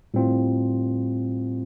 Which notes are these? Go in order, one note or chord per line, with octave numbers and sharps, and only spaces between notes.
A2 G3 C4 F4